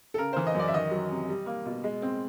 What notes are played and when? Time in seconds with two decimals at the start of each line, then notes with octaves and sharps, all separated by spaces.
0.14 A4
0.18 C#3 A#4
0.33 E3 C5
0.47 D#5
0.55 F#2 D5
0.68 E5
0.73 D#3 D#5
0.91 F#3
1.11 C3
1.28 G3
1.46 A#3
1.66 B2
1.84 G#3
2.02 C4